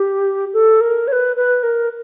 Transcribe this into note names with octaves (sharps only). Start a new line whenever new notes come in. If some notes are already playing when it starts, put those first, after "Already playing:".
Already playing: G4
A4
A#4
C#5
B4
B4
A#4